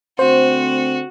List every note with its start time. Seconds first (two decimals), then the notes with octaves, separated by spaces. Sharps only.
0.19 D3 A3 C4 F#4 C5